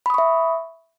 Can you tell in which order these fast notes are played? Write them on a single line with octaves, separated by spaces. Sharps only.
B5 D#6 C#6 E5